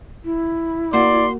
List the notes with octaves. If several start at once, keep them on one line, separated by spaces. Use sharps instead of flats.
E4
A#3 F#4 D5 C6